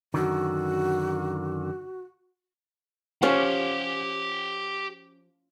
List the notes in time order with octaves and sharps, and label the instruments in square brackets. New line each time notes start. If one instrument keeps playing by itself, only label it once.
[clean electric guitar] F#2 D3 D#3 [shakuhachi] F#4
[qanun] F3 C#4 [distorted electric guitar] G4 F#5